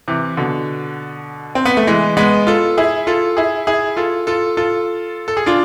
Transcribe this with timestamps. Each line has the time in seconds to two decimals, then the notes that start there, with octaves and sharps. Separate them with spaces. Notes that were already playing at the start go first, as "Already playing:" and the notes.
0.08 C3 E3
0.37 B2 D3
1.55 C4
1.65 B3
1.77 A3
1.87 E3 G#3
2.17 G#3 B3
2.47 F4 A4
2.78 E4 G#4
3.07 F4 A4
3.37 E4 G#4
3.67 E4 G#4
3.97 F4 A4
4.27 F4 A4
4.57 F4 A4
5.28 A4
5.37 G#4
5.46 D4 F4